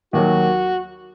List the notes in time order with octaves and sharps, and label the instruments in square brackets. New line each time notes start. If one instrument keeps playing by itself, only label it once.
[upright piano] D#2 D#3 F#3 [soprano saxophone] F#4